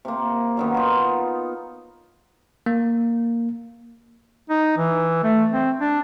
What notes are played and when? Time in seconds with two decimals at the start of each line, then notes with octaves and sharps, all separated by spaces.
0.05 C3 A#3
0.57 F#2 D#3 B3
0.74 D#4 F4
2.66 A#3
4.50 D#4
4.78 E3
5.24 A3
5.52 C4
5.81 D4